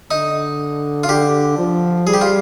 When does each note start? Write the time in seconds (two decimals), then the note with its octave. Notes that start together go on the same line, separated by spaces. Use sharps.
0.11 D3 D#4
1.04 F4
1.08 D3 G4
1.58 F3
2.06 G3 G#4
2.13 G4
2.21 F4